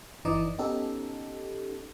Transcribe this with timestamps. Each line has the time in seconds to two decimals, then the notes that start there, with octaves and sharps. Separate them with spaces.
0.25 G1 E3 D#4 D5 D#5
0.58 B3 C#4 D#4 G4 A4